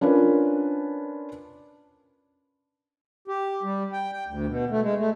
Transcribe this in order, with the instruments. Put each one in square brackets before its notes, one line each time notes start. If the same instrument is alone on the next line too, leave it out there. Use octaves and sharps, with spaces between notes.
[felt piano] C#4 D4 F4 A#4 B4
[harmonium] G4
G3
G5
G5
D2
B2
A3
G#3
A3